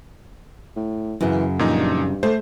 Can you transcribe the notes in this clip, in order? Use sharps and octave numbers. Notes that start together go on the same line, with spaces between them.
A2
F#2 C#3 E3
G2 A#2 F3 D#4
A3 C5